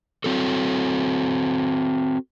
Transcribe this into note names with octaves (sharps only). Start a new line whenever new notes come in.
C4 F#4 A4